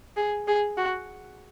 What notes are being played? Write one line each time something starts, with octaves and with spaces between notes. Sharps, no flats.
G#4
G#4
F#4